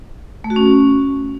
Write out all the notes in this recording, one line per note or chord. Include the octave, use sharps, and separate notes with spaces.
A3
F#4
C#4